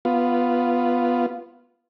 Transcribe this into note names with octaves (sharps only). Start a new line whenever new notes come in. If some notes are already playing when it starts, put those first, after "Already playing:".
B3 F4